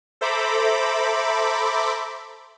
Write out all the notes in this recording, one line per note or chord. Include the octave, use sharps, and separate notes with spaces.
A4 C5 E5 A#5 B5 D6